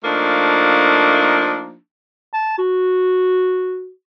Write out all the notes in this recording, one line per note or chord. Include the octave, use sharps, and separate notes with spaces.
F3 A3 A#3 D4 D#4
A5
F#4